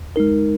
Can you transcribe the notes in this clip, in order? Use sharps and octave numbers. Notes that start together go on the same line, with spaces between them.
G#3 D#4 A#4